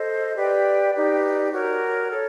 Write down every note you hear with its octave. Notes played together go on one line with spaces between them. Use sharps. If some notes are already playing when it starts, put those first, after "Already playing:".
Already playing: A4 C5 D#5
G4 B4 D5 G5
D#4 G4 B4 D5
F#4 A#4 C#5
A4 C#5